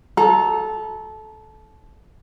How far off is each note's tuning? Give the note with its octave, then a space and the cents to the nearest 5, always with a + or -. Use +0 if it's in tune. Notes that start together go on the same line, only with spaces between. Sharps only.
A4 -20 A#5 +0